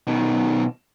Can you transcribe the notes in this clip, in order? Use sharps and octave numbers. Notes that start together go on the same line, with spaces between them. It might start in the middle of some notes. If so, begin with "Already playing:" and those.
B2 D#3